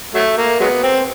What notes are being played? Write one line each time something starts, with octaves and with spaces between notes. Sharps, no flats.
F#3 A3
A#3
F#3 G#3 B3
C4